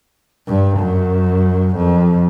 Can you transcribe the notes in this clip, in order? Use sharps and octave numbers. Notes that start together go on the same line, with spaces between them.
G2
F#2
F2